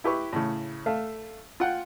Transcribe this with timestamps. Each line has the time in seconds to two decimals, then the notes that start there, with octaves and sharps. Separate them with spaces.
0.04 E4 G4 B4 C#6
0.33 A2 C#3
0.86 A3 E5 F5
1.60 F4 F#5 G5